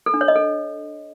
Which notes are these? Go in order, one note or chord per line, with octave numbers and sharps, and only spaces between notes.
A4
D4
C#5
D#5
A4